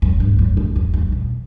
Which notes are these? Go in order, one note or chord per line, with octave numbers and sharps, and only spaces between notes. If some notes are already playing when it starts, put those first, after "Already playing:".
F#2
G2
F#2
F2
F2
F2
B2